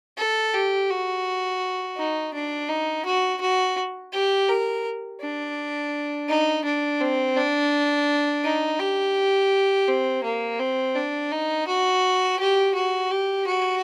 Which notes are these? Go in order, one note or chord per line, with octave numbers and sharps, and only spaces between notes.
A4
G4
F#4
D#4
D4
D#4
F#4
F#4
G4
A#4
D4
D#4
D4
C4
D4
D#4
G4
C4
A#3
C4
D4
D#4
F#4
G4
F#4
G4
F#4